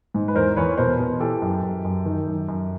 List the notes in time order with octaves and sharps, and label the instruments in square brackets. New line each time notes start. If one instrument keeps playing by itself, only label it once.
[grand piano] G#2
B4
E2 A#4 C5
E2 B4 C#5
B2 A#4 C5
B2
E3 G4 A4
F#2
F#2
F#2
D#3
F#2
F#2